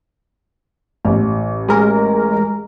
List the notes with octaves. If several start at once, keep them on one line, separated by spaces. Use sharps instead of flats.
A1
G#3 A#4